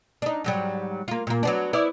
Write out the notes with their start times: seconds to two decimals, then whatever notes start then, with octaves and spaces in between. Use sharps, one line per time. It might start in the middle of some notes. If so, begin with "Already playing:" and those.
0.22 D4 D#4
0.44 G#2 F#3 G3
1.08 A#3 F4
1.27 A#2 A#3
1.43 F#3 B3 D4
1.73 B3 E4 D5